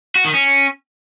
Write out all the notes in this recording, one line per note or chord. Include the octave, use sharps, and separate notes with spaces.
F#4
D#3
C#4